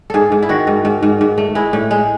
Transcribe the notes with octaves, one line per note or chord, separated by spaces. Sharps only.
G#2 G#4 A4
G#2
E4
D#3 F#4
G#2
G#2
G#2
G#2
A3
G#3 E4
A2
G#3